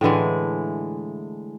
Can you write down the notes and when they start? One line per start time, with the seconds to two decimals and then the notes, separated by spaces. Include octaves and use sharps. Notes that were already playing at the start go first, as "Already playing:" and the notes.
0.01 A2 D3 E3 G#3